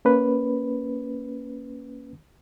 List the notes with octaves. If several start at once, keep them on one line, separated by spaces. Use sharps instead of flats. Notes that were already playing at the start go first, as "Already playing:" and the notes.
A#3 C#4 B4